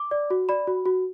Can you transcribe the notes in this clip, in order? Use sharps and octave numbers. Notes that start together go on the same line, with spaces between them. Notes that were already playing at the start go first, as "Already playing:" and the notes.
Already playing: D6
D5
F#4
D5 B5
F#4
F#4